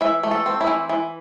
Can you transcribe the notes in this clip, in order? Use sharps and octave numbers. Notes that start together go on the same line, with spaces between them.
E3 E5
A3
A4
C4
E4
E3
E3